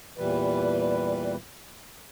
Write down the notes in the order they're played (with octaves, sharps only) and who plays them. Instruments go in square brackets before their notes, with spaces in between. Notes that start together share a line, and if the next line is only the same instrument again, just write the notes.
[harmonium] E2 A#2 E3 G3 B4